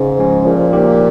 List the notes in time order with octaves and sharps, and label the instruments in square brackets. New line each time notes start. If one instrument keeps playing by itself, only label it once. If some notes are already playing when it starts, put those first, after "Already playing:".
Already playing: [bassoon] G#2 [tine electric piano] C#3
[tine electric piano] F3 G#3 C#4
[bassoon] A#2 [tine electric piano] F3
[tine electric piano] A#3 D#4 G4